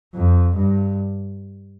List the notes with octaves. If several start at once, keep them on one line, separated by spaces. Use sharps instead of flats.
F2
G2